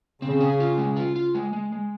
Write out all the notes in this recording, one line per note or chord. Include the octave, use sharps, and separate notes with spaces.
C#3 C4
G#4
F4
G#3
F4
F4
G#3
G#3
G#3